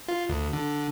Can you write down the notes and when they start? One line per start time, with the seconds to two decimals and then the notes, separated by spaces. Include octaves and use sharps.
0.08 F4
0.29 D2
0.53 D3